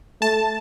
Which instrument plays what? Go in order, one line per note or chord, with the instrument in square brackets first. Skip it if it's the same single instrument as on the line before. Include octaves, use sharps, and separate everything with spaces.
[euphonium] A3 [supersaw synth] A5